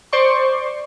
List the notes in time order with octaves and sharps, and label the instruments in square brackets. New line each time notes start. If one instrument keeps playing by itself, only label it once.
[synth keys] C5 D5 C6 C#6